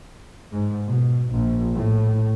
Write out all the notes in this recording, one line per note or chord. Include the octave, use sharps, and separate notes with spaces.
G#2
B2
A#1
A2